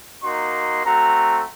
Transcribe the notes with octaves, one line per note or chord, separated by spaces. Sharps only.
A#3 D#4 F#4 C6
A3 C4 F#4 A#5